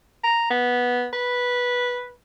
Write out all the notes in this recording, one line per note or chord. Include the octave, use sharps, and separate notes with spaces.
A#5
B3
B4